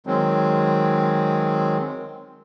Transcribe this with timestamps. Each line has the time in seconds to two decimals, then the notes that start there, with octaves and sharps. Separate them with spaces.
0.07 D#3 F#3 G#3 C4